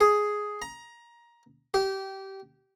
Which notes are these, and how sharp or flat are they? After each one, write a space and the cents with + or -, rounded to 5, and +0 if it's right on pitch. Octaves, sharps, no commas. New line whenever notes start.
G#4 +5
A#5 +20
G4 -20